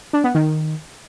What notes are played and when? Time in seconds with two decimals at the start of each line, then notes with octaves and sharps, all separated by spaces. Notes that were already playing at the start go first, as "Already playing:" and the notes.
0.13 D4
0.24 B3
0.35 D#3